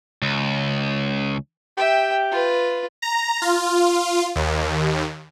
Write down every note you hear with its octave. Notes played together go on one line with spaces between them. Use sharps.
C#2
G4 E5 G5
F4 B4
A#5
F4
D#2